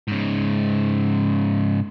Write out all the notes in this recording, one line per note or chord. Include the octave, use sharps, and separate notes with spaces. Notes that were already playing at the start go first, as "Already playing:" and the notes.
G#2 C#3